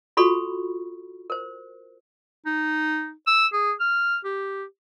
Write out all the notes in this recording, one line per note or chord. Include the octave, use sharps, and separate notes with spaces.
F4 F#4 A4 B5 C#6
A#4 C5
D#4
E6
G#4
F6
G4